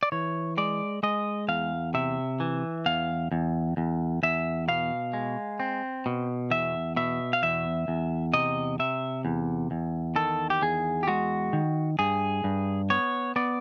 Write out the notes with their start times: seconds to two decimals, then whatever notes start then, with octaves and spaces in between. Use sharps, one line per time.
0.03 D5
0.12 E3 C#5
0.57 G#3 D5
1.03 G#3 D#5
1.48 E2 F5
1.94 C3 E5
2.40 E3
2.86 E2 F5
3.32 E2
3.77 E2
4.23 E2 E5
4.68 B2 F5
5.13 G#3
5.60 C4
6.06 B2
6.51 E2 E5
6.96 B2 E5
7.33 F5
7.43 E2 E5
7.88 E2
8.33 C3 D#5
8.79 C3 E5
9.25 E2
9.71 E2
10.16 D#3 A4
10.50 G4
10.62 E2 G#4
11.03 G4
11.07 G#3 F#4
11.53 D#3
11.99 G2 G#4
12.44 G2
12.90 B3 C#5
13.36 B3 D5